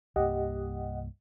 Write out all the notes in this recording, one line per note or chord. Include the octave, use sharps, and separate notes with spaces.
C2 G2 A#3 G4 D#5 F#5